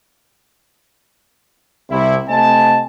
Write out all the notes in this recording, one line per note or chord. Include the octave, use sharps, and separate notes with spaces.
C2 C3 E4
C3 A3 C4 D#5 G#5 A5